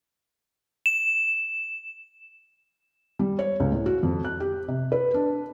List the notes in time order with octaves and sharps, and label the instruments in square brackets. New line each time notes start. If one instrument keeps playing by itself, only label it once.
[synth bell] E7
[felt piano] G3
C#5
C#2
A2
F#4
F2
F#6
G4
C3
B4
D4